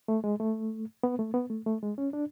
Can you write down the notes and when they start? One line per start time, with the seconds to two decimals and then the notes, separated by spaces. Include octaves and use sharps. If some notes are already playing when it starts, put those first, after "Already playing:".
0.08 A3
0.24 G#3
0.40 A3
1.03 B3
1.19 A3
1.34 B3
1.50 A3
1.66 A3
1.82 G#3
1.98 C#4
2.13 D4